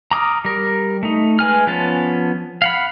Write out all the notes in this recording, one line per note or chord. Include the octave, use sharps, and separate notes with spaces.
A#5 D6 D#6 F6
G3 A#4
A3 D#4
G#3 B4 G#5 F6
F3 B3 C#4 A5
F5 F#5 B5